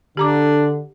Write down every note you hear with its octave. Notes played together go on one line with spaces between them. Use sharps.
D3 D4 G4 A#5 D6